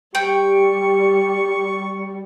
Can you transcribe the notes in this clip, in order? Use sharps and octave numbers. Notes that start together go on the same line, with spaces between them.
G3 G4 G5 C#6